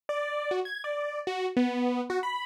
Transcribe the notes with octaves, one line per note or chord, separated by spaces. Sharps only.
D5
F#4
G#6
D5
F#4
B3
F#4
B5